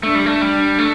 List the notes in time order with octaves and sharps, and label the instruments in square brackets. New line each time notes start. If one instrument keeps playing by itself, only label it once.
[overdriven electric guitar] A3 [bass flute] D4
[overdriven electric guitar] G3
A3
G3
A3